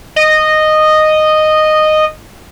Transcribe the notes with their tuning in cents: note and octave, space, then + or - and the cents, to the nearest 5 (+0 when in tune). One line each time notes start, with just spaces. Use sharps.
D#5 -10